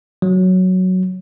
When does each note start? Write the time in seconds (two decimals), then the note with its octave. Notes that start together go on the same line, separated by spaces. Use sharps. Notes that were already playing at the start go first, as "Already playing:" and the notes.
0.22 F#3